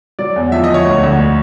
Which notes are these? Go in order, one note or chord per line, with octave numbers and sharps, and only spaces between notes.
F#3 D5
E2
F3 E5
D#5
F3
C#5
D2
D2